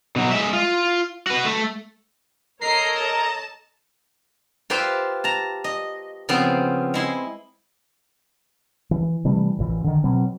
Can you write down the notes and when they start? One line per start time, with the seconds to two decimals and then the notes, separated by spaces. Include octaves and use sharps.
0.16 B2 F#3
0.31 G#3 E5
0.53 F4
1.27 F#4 B4
1.45 A3
2.62 A4 A#4 C#5 D#5 A#5 C7
2.97 A5
4.70 F4 G4 B4 C5 E5 G5
5.24 A5 A#5
5.64 D#5
6.29 C#3 F3 B3 C4
6.94 G#3 E4 C6
8.91 E3
9.25 C3 E3 G3 A3
9.59 A1 A#2 E3
9.84 D3 D#3
10.04 B2 F#3 C4